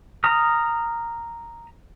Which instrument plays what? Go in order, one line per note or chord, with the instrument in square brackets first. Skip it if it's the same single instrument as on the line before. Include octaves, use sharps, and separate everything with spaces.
[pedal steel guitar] A#5 D#6 F6